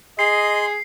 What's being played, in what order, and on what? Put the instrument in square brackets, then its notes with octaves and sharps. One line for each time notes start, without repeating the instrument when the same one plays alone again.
[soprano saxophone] G#4 [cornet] D#5 [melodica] C6 [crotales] C7